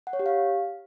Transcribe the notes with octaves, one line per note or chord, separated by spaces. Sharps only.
F#5
C#5
G4
F5